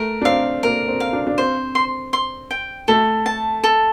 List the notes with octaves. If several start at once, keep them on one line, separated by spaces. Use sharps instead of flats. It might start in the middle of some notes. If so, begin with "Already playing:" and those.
Already playing: A3 A#4
D4
C4 F5
A#3 A#4
C4
F5
D4
D4
C4 C5
C6
C6
G5
A3 A4
A5
A4